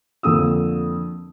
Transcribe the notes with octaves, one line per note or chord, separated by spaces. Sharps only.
F2 D3 A#3 D#6 E6